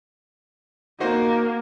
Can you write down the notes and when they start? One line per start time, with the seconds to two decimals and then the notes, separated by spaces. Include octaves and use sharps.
1.00 A#3 D#4 F#4 C5